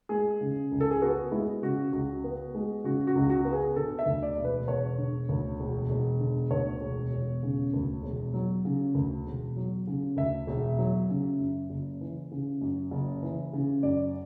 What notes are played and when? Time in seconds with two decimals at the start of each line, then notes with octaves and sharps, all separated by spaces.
0.09 G#3 G#4
0.41 C#3
0.72 C#2
0.80 A4
0.91 G#4
1.02 B3 F#4
1.32 G#3 E4
1.62 C#3 F#4
1.92 C#2 F#4
2.24 B3
2.55 G#3
2.84 C#3 F#4
3.07 F#4
3.15 C#2
3.30 F#4
3.45 B3
3.53 G#4
3.76 D3 A4
3.99 E5
4.06 D2
4.23 D5
4.37 E1
4.44 B4
4.68 E1 C#5
4.98 D3
5.29 D2
5.60 E1
5.90 E1
6.20 D3
6.51 D2 C#5
6.81 E1
7.13 E1
7.43 C#3
7.74 D2
8.03 E1
8.34 F#3
8.65 C#3
8.95 D2
9.26 E1
9.56 F#3
9.87 C#3
10.17 D2 E5
10.47 E1
10.78 F#3
11.09 C#3
11.39 F#2
11.70 F#1
12.01 E3
12.31 C#3
12.61 F#2
12.91 F#1
13.23 E3
13.53 C#3
13.83 F#2 D5